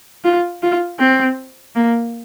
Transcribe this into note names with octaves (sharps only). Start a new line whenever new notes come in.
F4
F4
C4
A#3